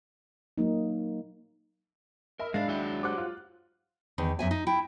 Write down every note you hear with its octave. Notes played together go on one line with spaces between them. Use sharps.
F#3 A#3 D#4
A#4 D#5 E5 B5
G#2 G#3 D4 F5
D#2 F#3 E4 F#4 G5
G4 C5 F#5 D6 F#6
F4
E2 D#3
F#2 E5 G#5
D#4
E4 G5